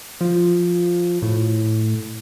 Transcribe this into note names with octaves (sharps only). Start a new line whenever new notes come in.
F3
A2